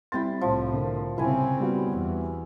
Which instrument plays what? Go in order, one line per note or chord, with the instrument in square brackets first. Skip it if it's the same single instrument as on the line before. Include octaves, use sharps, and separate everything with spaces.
[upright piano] G3 C4 A6 [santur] E4 G5 C6
[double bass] C2 A2 [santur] F3
[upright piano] D3 A#4
[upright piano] C2 [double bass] C#3 C4 [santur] E4 G#5
[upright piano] G3 B3 F#4
[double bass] E2